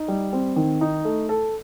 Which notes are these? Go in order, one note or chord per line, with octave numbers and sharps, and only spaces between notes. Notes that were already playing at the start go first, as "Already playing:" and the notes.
Already playing: D#4
G3
C4
D#3
D#4
A3
A4